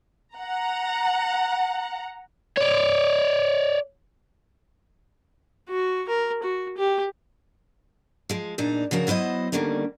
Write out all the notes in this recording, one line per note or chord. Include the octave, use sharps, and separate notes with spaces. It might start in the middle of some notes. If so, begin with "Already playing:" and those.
F#5 A#5
C#5 D5
F#4
A#4
F#4
G4
F3 G#3
E2 A#2 D4 D#4
C#3 F3 F#4 A#4
F#3 B3 E4 C5 D#5
D3 D#3 G3 A#3 C#4